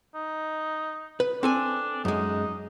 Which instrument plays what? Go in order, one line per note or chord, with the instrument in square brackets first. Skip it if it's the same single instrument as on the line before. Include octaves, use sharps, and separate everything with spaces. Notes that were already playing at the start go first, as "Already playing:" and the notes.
[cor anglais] D#4
[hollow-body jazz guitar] B4
[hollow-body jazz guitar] C4 A4 G#5 [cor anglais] D4
[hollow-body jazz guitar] F#2 G#3 [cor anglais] D#4